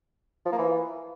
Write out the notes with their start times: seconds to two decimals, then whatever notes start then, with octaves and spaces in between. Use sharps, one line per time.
0.46 F3
0.52 A#3
0.58 E3